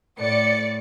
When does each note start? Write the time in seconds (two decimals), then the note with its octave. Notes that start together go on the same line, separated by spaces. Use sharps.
0.19 A2 D5 C#7